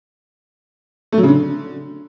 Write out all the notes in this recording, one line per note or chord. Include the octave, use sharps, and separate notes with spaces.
A3
F#3
C#3
D3